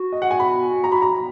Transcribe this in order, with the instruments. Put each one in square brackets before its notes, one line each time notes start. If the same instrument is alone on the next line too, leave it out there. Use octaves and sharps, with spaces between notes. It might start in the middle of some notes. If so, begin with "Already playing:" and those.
Already playing: [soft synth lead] F#4
[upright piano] D#5
F#5
G#5
B5
A#5
B5
A#5